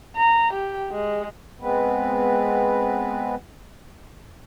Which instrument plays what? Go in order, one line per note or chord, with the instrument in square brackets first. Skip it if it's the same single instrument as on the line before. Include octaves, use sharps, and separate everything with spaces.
[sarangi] A#5
G4
G#3
[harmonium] G#3 B3 C4 B4